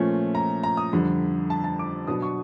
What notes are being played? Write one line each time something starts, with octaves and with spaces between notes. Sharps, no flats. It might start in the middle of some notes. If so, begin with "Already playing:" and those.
Already playing: A#2 F3 A3 C#4
A#5
A#5
D#6
F2 D3 G3
A5
A5
D6
B2 F#3 B3 D4 D#6
C#6